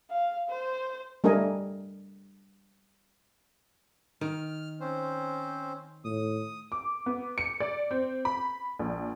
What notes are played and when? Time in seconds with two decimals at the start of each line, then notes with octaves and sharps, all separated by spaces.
0.10 F5
0.50 C5
1.24 G3 A3 D4 A#4 D#5 G#5
4.21 D#3 F6
4.80 C4 C#4 C5
6.05 A2 D#6
6.72 D6
7.06 B3
7.38 C#7
7.60 D5
7.91 C4
8.25 B5
8.79 A#1